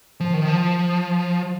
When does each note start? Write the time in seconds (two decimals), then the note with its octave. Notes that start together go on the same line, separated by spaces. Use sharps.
0.20 F3
0.33 D#3
0.45 F3